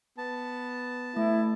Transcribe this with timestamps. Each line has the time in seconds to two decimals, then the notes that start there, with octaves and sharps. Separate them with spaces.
0.18 B3 A5
1.17 A3 E4